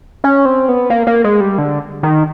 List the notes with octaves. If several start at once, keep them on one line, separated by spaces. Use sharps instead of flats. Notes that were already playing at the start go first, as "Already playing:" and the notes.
C#4
C4
B3
A#3
A#3
G#3
G3
D3
D#3